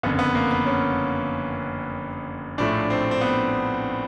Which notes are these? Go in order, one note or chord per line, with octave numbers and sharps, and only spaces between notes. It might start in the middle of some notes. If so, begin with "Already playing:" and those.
F#1 F2 D3 B3
B3
A#3
B3
C#4
A#1 A2 F3 A3 D4
C4
C4
B3